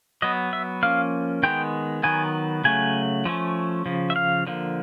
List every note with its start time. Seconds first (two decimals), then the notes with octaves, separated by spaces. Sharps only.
0.22 F#3 B3 D#5
0.53 E5
0.83 F3 A#3 C#4 F5
1.43 D#3 G#3 B3 G5
2.03 D#3 F#3 B3 G#5
2.64 C#3 F#3 A3 G#5
3.25 F3 A3 C#4
3.86 C#3 F3
4.10 E5
4.16 F5
4.47 D3 F3 A#3